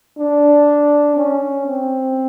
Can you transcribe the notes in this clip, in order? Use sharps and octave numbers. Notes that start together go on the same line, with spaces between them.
D4
C#4
C4